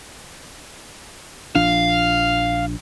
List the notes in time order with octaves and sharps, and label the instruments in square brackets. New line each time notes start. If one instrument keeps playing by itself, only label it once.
[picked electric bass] A#1 F3 D4 [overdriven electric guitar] F5